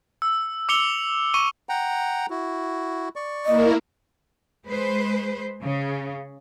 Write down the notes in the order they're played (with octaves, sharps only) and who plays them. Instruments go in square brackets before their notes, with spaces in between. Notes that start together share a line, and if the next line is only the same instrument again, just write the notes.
[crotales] E6
D6 E6 C#7 F7 G7
C#6 C#7 D#7 G7
[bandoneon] F#5 G5 A#5
E4 F#4
D5 C#6
[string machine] A#3 E4 A#4 [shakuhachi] D#5
[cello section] G#3 B4 C5
C#3